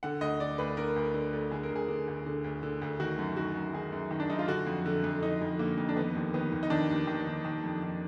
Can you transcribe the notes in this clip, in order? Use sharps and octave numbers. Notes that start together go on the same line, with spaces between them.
D3 F#5
D2 D#5
D3 D5
D2 B4
D3 A#4
D2
D3
D2
D3 G#4
A#4
D2
G#4
D3
D2
D3
D2
D3
D2
D#3 F#4
F#2
D#3 F#4
F#2
D#3 G#4
F#2
D#3
D4
F#2 D#4
F4
D3 F#4
F2
D3
F2
D3 D#4
F2
D3 A#3
F2
D4
D#3 B3
D#2
D#3 B3
D#2
D#4
D#3 D4
D#2
D#3
D#2
D#3
F2
D#3